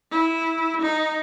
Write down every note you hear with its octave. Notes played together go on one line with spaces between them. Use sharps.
E4
D#4